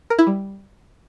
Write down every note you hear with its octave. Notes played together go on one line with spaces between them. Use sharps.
A#4
E4
G3